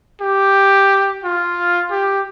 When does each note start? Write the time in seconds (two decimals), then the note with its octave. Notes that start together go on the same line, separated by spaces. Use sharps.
0.21 G4
1.24 F4
1.91 G4